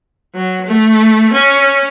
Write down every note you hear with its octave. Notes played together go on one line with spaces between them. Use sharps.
F#3
A3
C#4